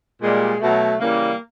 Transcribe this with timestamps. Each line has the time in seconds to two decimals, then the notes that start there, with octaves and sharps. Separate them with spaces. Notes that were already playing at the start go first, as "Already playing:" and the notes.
0.21 A#2 G3 G#3
0.60 B2 A3
0.65 F#3
0.99 C#3 E3 G3 A#3